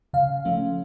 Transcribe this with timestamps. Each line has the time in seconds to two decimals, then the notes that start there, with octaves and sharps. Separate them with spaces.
0.13 C#3 F5
0.45 F3 A3 C#4